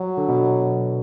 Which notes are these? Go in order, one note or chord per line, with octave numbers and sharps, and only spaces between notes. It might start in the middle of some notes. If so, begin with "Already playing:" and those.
Already playing: F#3
D3
B2